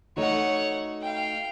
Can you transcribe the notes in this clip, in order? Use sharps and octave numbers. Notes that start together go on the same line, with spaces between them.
A3 D#4 F#4 C#5 F#5
F5 G5